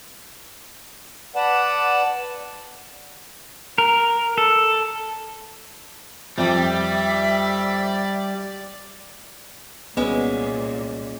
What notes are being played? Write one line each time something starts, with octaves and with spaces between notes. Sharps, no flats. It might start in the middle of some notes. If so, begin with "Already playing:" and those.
B4 D5 F#5 A5
A#4
A4
F2 G3 D5 E5
C2 A#2 G#3 B3 C#4